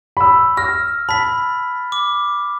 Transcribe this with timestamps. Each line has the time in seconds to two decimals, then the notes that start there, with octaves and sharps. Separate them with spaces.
0.17 B5 E6
0.57 F6 A#6
1.09 A5 B5 B6
1.92 D6